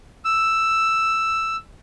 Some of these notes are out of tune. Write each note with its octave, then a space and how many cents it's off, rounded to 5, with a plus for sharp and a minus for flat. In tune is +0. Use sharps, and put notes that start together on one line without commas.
E6 +5